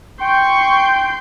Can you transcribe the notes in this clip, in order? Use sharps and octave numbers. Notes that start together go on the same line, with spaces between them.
G5 C6 C#6 G6